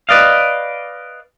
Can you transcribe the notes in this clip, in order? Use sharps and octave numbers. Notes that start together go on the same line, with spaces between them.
B4 D5 D#5 F5